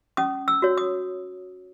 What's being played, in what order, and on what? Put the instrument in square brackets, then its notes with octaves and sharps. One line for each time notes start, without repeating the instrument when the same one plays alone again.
[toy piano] C#4 D#6
E6
F#4 C#5
D#6